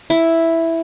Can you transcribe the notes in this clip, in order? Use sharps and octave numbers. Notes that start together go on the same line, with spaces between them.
E4